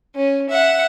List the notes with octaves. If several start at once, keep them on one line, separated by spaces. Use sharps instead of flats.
C#4
E5 F#5